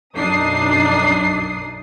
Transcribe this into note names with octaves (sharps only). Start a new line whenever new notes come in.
B1 F#2 D4 D#4 D#6 C7